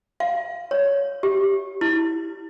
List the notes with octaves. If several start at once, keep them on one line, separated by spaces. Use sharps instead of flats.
F5
C#5
G4
E4